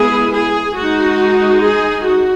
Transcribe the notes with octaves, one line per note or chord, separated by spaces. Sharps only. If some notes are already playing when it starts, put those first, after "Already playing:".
Already playing: G#3 B3 E4 G#4
G#4
G#3 D#4 F#4
G#4
F#4